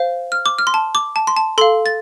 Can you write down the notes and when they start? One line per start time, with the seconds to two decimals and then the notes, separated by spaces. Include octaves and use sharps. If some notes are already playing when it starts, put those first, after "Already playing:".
Already playing: C5 F5
0.32 F6
0.46 D6
0.58 F6
0.67 C6
0.74 A5
0.95 D6
1.16 A5
1.27 C6
1.37 A5
1.58 A4 F5 C6
1.86 A6